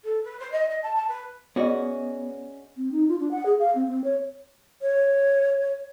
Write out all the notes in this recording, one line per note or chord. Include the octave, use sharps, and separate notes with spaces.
A4
B4
C5
D#5
D#5
A5
A5
B4
B3 C#4 F#4 G#4 D5 D#5
C4
D#4
F4
D4
F#5
G#4
F5
C4
C4
C#5
C#5